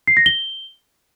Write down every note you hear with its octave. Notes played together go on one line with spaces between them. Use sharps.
C7
A#6
G7